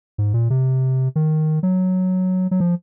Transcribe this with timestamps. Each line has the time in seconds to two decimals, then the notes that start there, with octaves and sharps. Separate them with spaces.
0.18 G#2
0.34 A#2
0.50 C3
1.16 D#3
1.63 F#3
2.51 F#3
2.60 F3